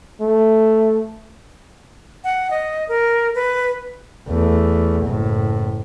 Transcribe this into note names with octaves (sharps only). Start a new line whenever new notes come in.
A3
F#5
D#5
A#4
B4
E2 A3
F#1 A2